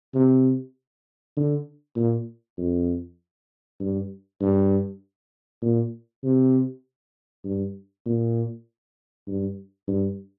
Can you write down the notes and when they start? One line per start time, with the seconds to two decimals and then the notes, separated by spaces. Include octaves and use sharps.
0.15 C3
1.37 D3
1.96 A#2
2.58 F2
3.80 G2
4.41 G2
5.62 A#2
6.23 C3
7.45 G2
8.06 A#2
9.28 G2
9.88 G2